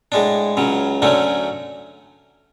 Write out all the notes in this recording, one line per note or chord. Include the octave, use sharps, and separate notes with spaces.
A2 G#3 D4
C#2 C#3 F#3
D2 D3 F#3 A3 C#4